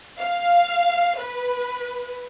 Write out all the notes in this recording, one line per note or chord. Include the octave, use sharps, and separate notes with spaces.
F5
B4